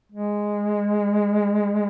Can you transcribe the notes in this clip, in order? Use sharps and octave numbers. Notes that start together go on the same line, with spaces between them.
G#3